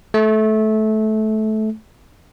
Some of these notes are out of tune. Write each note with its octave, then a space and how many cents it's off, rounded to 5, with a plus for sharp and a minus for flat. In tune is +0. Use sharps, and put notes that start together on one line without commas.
A3 -20